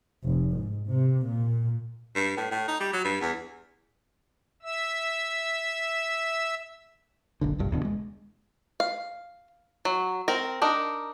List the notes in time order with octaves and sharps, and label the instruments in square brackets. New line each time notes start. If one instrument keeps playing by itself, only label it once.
[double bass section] F1
G#2
C3
A#2
[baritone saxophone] G2
A2
A2
D#4
G3
F#3
G2
E2
[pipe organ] E5 E6
[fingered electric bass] F#1 B1 D3
F#1 C2 G2
D1 E2 B2 D3
G#3
[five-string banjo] F5
F#3
C4 A#4
D4 D#4 A#4